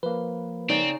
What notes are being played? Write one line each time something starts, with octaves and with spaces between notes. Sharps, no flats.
F3 A#3 B4
C#3 C4 D#4 D5